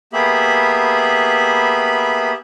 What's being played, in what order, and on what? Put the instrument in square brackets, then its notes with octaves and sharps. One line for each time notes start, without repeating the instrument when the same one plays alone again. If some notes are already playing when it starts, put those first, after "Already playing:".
[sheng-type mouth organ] A#3 B3 G4 G#4 E5 B5